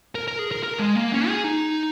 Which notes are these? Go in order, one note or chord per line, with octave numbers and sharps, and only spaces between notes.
A#4
A#4
G#4
A#4
A#4
G#3
A#3
C#4
G#4
D#4